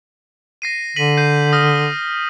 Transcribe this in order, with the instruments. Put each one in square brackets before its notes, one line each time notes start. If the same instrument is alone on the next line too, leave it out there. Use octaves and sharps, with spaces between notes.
[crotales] A#6 C7 D#7
[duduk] D3 [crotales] B6 D#7 F#7
[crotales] G6 C7 D#7
D#6 F6 A#6